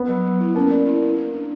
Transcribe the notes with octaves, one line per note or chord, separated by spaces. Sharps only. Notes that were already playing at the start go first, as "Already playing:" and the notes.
Already playing: B3
F#3
F#3
E4
A#3 C#4
D5
E4
E4
A#4
D4